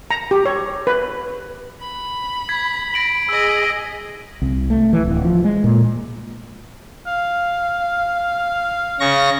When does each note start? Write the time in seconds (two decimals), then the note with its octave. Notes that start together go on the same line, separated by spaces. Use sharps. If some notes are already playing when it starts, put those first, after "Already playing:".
0.11 A#5
0.31 G4
0.46 C#5
0.87 B4
1.80 B5
2.49 G#6 B6
2.94 A#6 D7 F#7
3.29 G#4 D#5 E6 D7
4.42 C2
4.70 A3
4.93 E3
5.05 D1
5.25 F3
5.44 G#3
5.64 A#2
7.07 F5
9.00 C#3 C#6 A#6